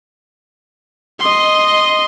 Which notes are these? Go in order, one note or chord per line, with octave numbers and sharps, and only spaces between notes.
D#5 C6